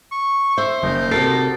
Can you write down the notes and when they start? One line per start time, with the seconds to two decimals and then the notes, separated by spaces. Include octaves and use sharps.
0.11 C#6
0.58 C5 E5
0.83 F#1 D#4
1.11 C3 F#4 A4 A#4 C7